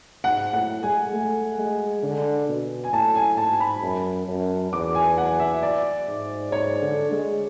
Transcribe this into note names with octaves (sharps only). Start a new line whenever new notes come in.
G#2 F#5
A2 F#5
G#3 G#5
A3
G#3
D3
B2
G#5
A2 A5
G#5
G#2 A5
B5
F#2
F#2
E2 D6
G#5
F#5
E5
D5
G#2
G#2 C#5
D3
G#3